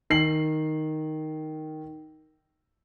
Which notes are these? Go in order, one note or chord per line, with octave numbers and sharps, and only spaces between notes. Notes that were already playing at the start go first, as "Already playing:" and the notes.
D#3 C7 F#7